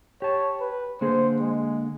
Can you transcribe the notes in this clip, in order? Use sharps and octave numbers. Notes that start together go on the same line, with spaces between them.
G4 C#5 A5
B4
D3 A#3 G#4 C5
G#3